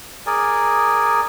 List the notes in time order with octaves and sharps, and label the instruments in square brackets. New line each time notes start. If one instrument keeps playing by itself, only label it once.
[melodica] G#4 A#4 D5 G#5